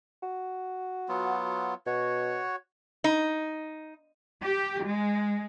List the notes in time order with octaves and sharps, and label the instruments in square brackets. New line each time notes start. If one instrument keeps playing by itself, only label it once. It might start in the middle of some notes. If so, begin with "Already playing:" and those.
[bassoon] F#4
[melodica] F#3 B3 F4
[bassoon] B2 [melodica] F#4 C#5
[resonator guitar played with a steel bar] D#4
[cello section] G4
G#3